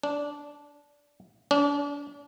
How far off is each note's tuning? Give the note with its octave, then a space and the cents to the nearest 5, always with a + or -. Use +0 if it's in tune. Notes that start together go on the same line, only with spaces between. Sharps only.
D4 -15
D4 -40